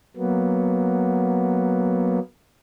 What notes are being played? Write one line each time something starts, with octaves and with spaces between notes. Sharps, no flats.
F#3 A#3 B3